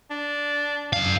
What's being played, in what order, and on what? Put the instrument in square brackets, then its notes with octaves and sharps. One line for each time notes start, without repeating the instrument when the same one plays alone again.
[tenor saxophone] D4
[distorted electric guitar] F#2 F5